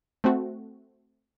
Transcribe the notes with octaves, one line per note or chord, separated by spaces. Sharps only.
A3 C4 F#4